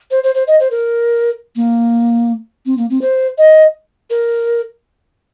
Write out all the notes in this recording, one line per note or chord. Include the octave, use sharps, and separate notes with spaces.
C5
C5
C5
D#5
C5
A#4
A#3
C4
A#3
C4
C5
D#5
A#4